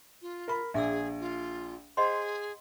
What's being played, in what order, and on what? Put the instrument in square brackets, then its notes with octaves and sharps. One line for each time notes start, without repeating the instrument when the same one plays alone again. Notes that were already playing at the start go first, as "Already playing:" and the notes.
[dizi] F4
[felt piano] A#4 B5
[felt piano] A#1 [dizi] G#4 [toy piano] E5 D6 E6
[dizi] F4
[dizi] G#4 [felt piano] C5 [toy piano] D#5 F#5 C6